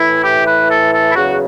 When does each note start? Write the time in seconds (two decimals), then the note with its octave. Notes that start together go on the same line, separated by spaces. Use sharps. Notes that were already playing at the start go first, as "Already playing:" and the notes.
Already playing: A2 E3 E4
0.23 G4
0.46 B4
0.70 A4
0.93 A4
1.10 E4
1.15 E2 C#3 F#3 F#4